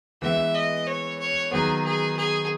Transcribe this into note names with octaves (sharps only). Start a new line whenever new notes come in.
E3 G#3 B3 E5
D#5
C#5
C#5
D#3 F#3 B3 G#4
G#4
G#4